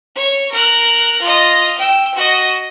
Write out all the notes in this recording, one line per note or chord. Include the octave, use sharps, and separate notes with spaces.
C#5
A#4 F#6
F4 D#5
G5 E6
F#4 D#5